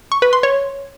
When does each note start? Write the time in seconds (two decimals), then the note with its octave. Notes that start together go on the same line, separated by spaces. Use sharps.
0.12 C#6
0.22 B4
0.33 C6
0.43 C#5